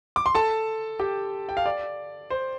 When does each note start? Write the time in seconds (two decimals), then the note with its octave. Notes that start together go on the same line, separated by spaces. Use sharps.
0.16 D6
0.26 C6
0.35 A4 A5
1.00 G4 G5
1.49 G5
1.57 F5
1.66 D5
2.30 C5